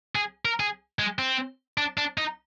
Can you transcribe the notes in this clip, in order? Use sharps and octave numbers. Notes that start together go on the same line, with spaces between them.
G#4
A#4
G#4
G#3
C4
D4
D4
D#4